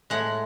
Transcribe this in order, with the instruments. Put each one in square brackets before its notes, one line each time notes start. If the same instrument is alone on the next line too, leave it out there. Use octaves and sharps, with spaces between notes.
[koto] A2 G#3 F#5